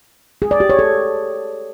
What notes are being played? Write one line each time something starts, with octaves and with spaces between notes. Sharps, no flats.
G#4
D5
G4
C#5
A4